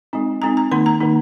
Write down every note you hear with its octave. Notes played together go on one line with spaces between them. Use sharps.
G#3 C4 D#4
G#3 C4 D#4 A#5
A#5
D#3 A#3 D#4 C6
A#5
D#3 A#3 D#4